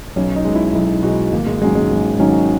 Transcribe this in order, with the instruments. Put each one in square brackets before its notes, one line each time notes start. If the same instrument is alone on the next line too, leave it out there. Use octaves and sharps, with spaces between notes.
[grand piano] B1 [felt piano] C#4
[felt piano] D#4
[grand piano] B2 G#3
[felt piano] E4
[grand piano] B1 [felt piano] E4
[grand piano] B2 G#3 [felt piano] F#4
[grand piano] G#1 [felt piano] A#3
[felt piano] G#3
[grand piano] G#2 D#3 F#3 C#4 [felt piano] G#3
[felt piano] G#3
[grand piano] G#1
G#2 D#3 F#3 C#4